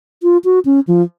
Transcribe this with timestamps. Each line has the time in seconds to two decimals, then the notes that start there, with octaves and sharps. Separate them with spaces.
0.23 F4
0.45 F#4
0.65 C#4
0.87 F3